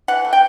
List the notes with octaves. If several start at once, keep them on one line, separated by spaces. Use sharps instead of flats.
E3 F#5
A3
G5